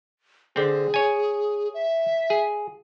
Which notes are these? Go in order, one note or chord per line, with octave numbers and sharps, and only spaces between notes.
D3 C4 G#4
C#5 G#5
E5
G#4